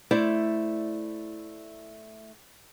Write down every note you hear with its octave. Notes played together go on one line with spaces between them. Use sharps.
A3 E4 C5 D5